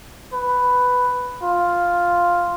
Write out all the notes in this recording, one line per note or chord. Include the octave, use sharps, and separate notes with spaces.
B4
F4